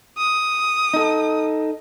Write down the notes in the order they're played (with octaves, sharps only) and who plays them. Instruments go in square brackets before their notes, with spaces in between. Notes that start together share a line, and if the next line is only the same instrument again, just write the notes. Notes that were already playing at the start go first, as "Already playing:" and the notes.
[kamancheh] D#6
[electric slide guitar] D#4 A4